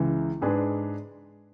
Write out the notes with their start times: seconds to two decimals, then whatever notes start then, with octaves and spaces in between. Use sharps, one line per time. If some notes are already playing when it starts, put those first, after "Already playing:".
Already playing: C#2 C#3 E3 G#3
0.41 G#2 G#3 D4 G#4 B4